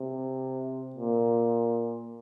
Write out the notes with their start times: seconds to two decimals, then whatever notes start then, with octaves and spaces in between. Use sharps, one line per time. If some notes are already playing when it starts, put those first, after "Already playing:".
Already playing: C3
0.96 A#2